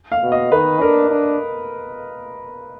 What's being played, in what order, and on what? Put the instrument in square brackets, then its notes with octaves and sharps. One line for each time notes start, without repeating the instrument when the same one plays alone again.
[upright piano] F5
[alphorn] B2
[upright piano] D#5
[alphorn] D#3 [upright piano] B4
[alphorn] D4 [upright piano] A#4
[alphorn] D4